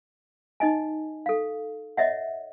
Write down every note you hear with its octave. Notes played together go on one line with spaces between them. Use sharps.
D#4 D#5 G#5
A4 F5
C#5 D#5 E5 F#5